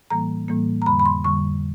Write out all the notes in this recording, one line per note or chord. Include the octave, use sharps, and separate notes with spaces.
A2 E3 G3 A#3 A#5
A2 E3 G3 A#3
A#5
F2 D3 G3 B5
B5
C6
F2 D3 G3 C#6